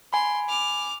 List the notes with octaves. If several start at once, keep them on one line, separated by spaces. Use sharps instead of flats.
G#5 B5 C6
D6 F6